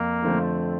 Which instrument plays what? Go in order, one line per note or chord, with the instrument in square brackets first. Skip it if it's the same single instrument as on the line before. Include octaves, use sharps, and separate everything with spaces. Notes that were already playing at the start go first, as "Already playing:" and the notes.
Already playing: [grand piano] F2 [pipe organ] A#3
[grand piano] D3 F3 A3 C4